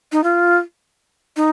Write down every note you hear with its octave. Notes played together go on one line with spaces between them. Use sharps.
D#4
F4
D#4